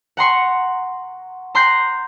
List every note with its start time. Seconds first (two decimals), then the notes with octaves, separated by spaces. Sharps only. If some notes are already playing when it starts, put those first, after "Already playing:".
0.17 F#5 A#5 C6 C#6
1.55 A#5 C6 F#6 G6 A#6 C7